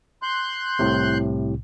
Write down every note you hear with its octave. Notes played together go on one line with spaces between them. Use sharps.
C6 F#6 G6
C2 A2 C3